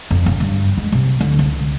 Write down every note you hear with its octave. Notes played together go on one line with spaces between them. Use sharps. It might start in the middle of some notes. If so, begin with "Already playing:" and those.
F2
C#3
G2
G#3
C3
D2
C#2